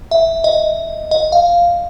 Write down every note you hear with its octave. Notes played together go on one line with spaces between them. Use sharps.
E5
D#5
D#5
F5